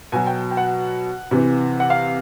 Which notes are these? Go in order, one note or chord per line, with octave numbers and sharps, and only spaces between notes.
B2 F#3 G#5
G5
G5
F#5
C3 E3
F#5
F5